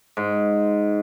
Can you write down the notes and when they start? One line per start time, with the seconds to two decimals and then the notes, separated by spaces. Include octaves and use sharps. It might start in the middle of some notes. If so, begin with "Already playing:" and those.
0.17 G#2